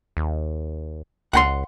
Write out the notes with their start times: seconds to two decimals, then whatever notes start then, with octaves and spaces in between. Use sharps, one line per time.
0.17 D#2
1.33 C#2 F#5 G5 C6